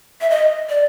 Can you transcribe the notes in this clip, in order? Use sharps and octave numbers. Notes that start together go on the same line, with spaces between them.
E5
D#5
D5